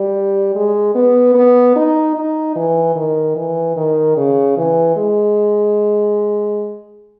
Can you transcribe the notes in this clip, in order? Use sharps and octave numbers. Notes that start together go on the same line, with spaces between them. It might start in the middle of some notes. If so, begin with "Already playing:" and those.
Already playing: G3
G#3
B3
B3
D#4
D#4
E3
D#3
E3
D#3
C#3
E3
G#3